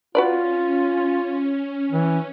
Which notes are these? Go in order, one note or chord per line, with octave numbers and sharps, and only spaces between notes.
C#4 F4 F#4 B4 D5
E3